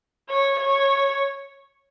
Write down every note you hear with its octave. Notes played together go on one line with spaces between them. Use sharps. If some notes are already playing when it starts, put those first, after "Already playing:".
C#5
C#5